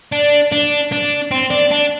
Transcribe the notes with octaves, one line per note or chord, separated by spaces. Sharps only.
D4
D4
D4
C4
D4
D4